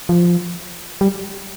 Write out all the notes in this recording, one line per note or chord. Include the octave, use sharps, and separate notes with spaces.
F3
G3